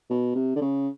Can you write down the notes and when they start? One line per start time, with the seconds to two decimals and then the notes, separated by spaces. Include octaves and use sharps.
0.10 B2
0.35 C3
0.56 D3
0.61 C#3